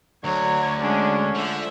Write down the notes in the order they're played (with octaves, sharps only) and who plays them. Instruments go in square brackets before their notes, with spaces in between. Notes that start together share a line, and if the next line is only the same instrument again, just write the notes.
[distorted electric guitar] D2 [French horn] D3 [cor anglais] F#3 [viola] C#5
[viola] G#3 D4 [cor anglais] C#4
[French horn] D3 [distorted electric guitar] F3 [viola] E5